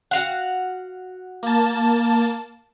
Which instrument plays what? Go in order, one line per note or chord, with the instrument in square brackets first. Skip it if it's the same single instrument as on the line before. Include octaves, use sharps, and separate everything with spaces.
[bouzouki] F#4 F5 F#5
[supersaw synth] A#3 A5